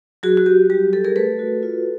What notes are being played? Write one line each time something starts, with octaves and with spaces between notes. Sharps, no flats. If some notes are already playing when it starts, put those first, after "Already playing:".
F#3 F#4 G#4
F#4
F#3 G4
G3 G4
G3 G4 A4
G#4 A#4
A3 A4 B4
F#4
F4